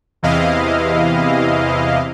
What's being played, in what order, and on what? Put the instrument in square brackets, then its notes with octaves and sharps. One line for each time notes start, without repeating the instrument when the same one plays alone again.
[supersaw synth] E2 C3 E3 E4 D#5 F5